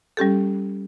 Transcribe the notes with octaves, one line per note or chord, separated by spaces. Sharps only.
G3 C#4 G4 A4